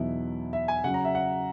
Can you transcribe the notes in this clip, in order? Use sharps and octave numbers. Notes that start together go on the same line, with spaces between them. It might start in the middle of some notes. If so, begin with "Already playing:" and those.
Already playing: E2 B2 F#3 B3 D#4 E4
E5
G#5
C#3 F#3 C#4 F#5
A#5
E5
F#5